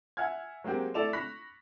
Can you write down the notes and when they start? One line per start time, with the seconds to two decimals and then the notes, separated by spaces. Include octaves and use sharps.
0.17 E5 F#5 G#5 F6 G#6
0.64 F#3 G#3 A#3 C4 G4
0.94 A3 E4 A4 D5 E7 F7
1.13 B5 C#6 F#6 A#6 B6